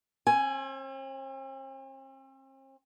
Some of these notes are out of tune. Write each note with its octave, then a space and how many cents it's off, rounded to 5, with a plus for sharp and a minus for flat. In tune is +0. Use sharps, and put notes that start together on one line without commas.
C4 +45 G#5 +0